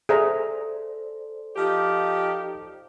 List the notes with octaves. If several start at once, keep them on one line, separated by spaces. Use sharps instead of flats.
G#4 A4 C5 D5 E5 A#5
F3 D#4 G4